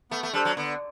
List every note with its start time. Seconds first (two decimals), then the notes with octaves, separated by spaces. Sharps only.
0.11 A3 B3
0.23 A3
0.33 G3 D4 A4 C5
0.45 F#3
0.57 D3 B3